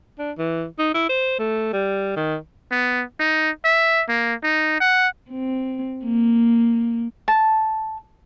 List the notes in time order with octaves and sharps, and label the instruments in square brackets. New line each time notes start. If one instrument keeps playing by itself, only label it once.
[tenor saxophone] D4
E3
D#4
E4
C5
A3
G3
D#3
[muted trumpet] B3
D#4
E5
A#3
D#4
F#5
[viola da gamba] C4
A#3
[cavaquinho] A5